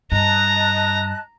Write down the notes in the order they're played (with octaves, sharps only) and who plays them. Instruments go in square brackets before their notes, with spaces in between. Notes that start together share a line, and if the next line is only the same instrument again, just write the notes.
[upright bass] G2 [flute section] D#5 A5 F#6 [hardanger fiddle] A#5